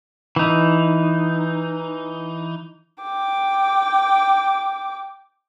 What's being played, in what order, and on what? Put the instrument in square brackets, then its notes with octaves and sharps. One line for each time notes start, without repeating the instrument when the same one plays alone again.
[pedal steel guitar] E3 D#4
[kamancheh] G5 D6